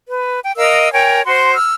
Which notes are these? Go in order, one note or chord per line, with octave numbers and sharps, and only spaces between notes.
B4
G5
A#4 D#5 F5 E6
A#4 C#5 G5 G#5
F#4 C5 C6
E6 F6